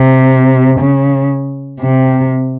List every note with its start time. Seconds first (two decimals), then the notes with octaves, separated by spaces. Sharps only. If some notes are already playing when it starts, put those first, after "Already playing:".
Already playing: C3
0.80 C#3
1.80 C3